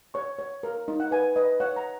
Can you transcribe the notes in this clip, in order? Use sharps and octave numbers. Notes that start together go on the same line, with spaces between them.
C#5 C#6
C#5
A#4
D#4
F#5
B4 G#5
B4 D#5
C#5 F#5
A#5